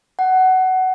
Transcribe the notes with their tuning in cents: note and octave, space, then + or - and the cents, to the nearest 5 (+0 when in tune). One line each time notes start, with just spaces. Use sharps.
F#5 +15